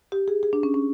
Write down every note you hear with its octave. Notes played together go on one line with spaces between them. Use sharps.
G4
G#4
G#4
D4
C#4
C#4